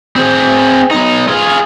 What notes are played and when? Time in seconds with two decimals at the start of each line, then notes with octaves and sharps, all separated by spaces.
0.16 C4 G#4
0.91 B1 D#4
1.28 F4 G#4